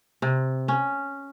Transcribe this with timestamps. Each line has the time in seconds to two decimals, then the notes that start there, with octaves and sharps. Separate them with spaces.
0.22 C3
0.68 C#4